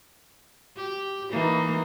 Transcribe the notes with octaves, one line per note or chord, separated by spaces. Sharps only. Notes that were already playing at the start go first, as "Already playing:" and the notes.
G4
E3 A#3 D#4